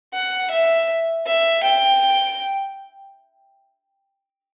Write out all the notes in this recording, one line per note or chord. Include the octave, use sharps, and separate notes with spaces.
F#5
E5
E5
G5